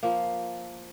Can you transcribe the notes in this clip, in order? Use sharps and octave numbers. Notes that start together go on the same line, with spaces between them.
F3 A#3